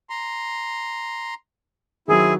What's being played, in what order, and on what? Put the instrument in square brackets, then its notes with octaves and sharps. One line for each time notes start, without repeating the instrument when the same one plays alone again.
[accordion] A#5 C6
[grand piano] D#3 F#3 [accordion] C4 E4 [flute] G#4